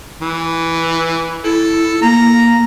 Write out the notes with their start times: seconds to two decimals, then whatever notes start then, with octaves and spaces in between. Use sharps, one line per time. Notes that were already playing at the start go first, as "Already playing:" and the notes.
0.21 E3
1.44 E4 A4
2.02 A#3 A#5